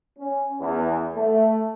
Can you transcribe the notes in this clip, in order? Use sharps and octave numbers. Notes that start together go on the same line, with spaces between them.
C#4
E2
A3